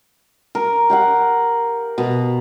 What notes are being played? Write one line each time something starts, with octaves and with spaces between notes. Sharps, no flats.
A#4
G4 F5 F#5
B2